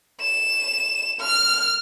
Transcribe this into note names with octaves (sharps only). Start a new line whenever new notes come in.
E7
F6